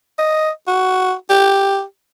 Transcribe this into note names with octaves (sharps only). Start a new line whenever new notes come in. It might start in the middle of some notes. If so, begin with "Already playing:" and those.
D#5
F#4
G4